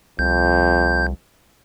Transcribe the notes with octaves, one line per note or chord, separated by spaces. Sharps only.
C2 F2 G6